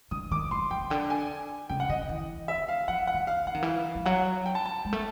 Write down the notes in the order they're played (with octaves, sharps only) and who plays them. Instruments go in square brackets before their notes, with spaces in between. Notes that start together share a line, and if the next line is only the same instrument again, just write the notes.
[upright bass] D3 [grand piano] D#6
[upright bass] D#3 [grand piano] D6
[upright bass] F3 [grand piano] C6
[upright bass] E3 [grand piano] G5
[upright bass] C#3
[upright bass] D3 [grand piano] G5
[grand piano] G#5
[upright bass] C#3 [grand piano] G5
[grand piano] F#5
[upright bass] D3 [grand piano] D#5
[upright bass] E3
[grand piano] E5
F5
[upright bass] F3 [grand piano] F#5
[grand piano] F#5
[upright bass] D#3
[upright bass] D#3 [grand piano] F5
[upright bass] E3 [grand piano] F#5
[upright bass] D#3
[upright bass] E3 [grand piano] F5
[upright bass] F3
[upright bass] F#3 [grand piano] F#5
[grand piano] G5
A5
A5
[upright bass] G#3
A3